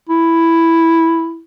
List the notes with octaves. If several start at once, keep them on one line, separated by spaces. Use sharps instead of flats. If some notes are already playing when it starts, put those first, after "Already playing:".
E4